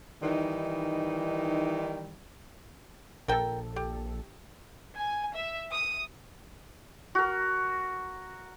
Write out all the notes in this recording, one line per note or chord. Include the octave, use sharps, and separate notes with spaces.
D#3 E3 G3 D#4
A#1 A4 A#4 G5
G4
G#5
E5
D#6
F#4 A#4